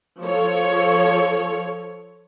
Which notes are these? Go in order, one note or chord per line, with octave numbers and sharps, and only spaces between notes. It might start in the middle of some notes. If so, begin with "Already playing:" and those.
F3 A4 C#5